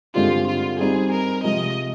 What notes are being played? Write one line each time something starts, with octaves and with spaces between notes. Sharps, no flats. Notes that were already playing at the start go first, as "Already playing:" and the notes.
G2 D3 G#3 C4 F4 G4
F4
G3 C4 D#4 G#4
A#4
C3 F3 G#3 D#5